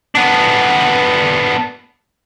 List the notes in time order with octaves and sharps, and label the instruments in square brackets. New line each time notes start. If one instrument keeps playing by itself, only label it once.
[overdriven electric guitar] B3 D4